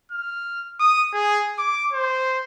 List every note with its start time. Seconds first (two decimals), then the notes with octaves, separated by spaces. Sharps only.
0.12 F6
0.80 D#6
1.13 G#4
1.58 D6
1.93 C5